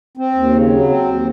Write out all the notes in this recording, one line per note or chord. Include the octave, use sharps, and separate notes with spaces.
C4
D#2
C#3
F#3
C4
D#2